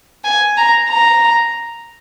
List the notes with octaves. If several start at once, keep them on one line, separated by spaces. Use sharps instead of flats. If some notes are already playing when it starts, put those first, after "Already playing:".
G#5
A#5
A#5